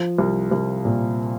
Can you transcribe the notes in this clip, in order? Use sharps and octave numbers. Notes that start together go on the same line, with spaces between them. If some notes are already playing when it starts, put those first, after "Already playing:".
Already playing: F3
C2
C2
A#2